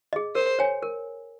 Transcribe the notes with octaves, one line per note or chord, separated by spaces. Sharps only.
G#4 D#5
A#4 C5
C#5 G#5
A#4